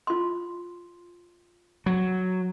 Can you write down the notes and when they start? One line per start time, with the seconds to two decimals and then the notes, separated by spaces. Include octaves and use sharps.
0.07 F4 C6
1.86 F#3